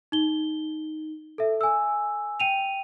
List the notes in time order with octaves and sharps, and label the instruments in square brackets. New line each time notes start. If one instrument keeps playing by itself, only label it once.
[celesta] D#4 G7
A4 E5
G#5 E6
G5 D#7 F7